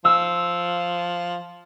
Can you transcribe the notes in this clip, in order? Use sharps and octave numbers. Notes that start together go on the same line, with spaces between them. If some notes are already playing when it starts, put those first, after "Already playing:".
F3 E6